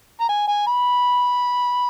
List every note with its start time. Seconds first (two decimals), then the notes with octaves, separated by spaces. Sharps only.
0.21 A#5
0.29 G#5
0.48 G#5
0.67 B5